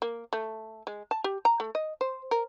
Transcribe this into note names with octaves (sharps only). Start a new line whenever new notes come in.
A#3
A3
G#3
A5
G4
A#5
A3
D#5
C5
A#4